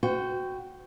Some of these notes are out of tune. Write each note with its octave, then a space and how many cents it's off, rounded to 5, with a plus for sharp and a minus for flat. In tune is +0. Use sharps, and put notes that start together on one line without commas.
F#4 +0 C5 -45 G5 -5